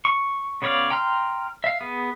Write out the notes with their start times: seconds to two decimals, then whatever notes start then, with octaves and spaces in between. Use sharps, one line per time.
0.05 C#6
0.62 C#3 B3 C#5 D5 F5
0.90 G5 A#5 C6 F6
1.64 E5 F5
1.81 B3 G#4